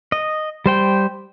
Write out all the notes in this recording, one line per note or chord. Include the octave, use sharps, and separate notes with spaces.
D#5
G3 C5 G5